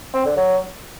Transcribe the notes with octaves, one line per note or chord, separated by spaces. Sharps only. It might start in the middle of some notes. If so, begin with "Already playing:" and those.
C4
D3
F#3